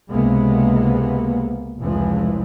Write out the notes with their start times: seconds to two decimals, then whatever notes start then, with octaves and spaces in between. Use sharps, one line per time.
0.10 C#2 C3 G#3 A#3 B3
1.79 F1 C#2 E3 F3 G#3